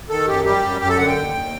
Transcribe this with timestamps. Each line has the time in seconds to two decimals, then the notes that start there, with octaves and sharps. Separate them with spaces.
0.09 D#3 A4
0.27 F#2 G4
0.45 G3 G4
0.63 F#2
0.81 F#2 G4
0.89 A4
0.98 D3 F#5
1.07 G5
1.16 D#2
1.34 D#2